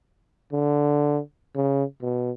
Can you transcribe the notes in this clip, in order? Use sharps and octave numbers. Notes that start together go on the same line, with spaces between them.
D3
C#3
B2